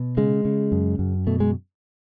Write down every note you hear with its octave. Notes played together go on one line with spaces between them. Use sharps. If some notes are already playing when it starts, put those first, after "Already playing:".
Already playing: B2
C#3 G#3
C#3
F#2
F#2
B2 A3
G#3